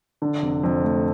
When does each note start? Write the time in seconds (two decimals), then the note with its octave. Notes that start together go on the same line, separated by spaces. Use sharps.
0.22 D3
0.42 F1
0.63 F2
0.83 A3